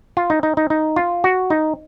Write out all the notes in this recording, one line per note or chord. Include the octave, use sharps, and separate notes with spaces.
F4
D#4
D#4
D#4
D#4
F4
F#4
D#4